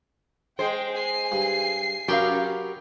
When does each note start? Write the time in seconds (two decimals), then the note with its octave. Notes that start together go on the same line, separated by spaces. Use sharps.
0.59 G#3 C5 G5
0.95 G#5 C7
1.32 G2
2.08 F#2 F#3 G4 A#4 B4 F5